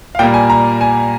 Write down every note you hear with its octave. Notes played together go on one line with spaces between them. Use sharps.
F5
A#2 G3 A#3 G5
G#5
A#5
G#5